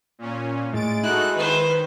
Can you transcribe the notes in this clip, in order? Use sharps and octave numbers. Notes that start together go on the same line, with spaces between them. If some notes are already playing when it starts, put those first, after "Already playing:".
A#2 C#4
A2 G#3 A6 D7
D#4 E4 F#4 A4 F#6
D#3 B4 C5